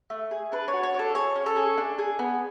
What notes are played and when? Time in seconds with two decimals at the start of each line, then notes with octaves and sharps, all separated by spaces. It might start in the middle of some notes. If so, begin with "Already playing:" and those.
0.10 A3
0.31 G#4
0.52 D4 B4
0.68 C#5
0.73 F#4
0.83 C#5
0.94 D4 A4
1.14 G#4 C#5
1.36 C#4
1.46 A4
1.56 G#4
1.78 D4
1.98 G#4
2.19 B3